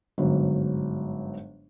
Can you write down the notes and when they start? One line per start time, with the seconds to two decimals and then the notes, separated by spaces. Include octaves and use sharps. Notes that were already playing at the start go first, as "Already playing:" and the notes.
0.18 G1 G#2 F#3